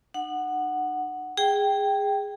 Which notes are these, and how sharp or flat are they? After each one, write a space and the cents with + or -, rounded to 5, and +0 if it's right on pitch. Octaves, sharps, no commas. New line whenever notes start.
D#4 -45 F#5 +0
G#4 -15 G5 +0